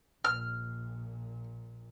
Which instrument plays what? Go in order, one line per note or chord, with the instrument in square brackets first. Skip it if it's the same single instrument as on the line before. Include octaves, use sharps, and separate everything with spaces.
[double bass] A#1 A#2 [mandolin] F6